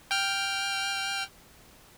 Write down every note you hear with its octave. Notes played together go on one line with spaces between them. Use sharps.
G5 F6